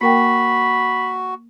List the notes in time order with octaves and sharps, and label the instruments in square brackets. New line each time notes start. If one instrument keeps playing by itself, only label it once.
[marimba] A#3 A#4 G5 [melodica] F#4 [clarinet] B5